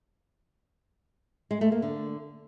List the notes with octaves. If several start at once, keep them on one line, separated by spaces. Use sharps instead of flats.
G#3
A3
A#3
D3